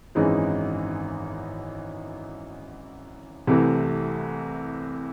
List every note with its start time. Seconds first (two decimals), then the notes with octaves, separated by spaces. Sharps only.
0.15 G#1 F#2 E3 G#3 D#4
3.47 C2 C3 E3 A3